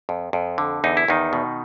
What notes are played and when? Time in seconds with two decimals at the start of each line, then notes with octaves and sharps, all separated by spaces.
0.09 F2
0.33 F2
0.58 D3
0.84 E2 D#4
0.97 E4
1.08 E2 D#3 D#4
1.33 B2